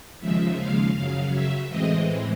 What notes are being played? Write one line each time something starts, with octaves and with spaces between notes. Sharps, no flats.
D#2 C#3 F3 G#3 E5
F5
F#2 C#3 F#3 F5
E5
A2 E3 G#3 C4 D#5